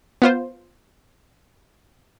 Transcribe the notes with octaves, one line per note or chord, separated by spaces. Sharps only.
B3 F4 C5